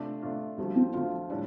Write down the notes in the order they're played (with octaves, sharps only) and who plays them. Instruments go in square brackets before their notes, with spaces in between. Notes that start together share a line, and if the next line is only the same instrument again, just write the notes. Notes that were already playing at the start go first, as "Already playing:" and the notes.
Already playing: [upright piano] C3 A3 D4 F4
C3 A3 D4 F4
[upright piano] D2 D3 F3 [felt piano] G3
[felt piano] C4
[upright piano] D2 D3 F3 [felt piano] F4
[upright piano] A2 G3 [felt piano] D4